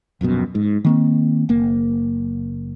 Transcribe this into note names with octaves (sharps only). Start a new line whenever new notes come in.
D#1 A#1 F#2 B2
G#2
D#3 A#3 C4
F#1 A#3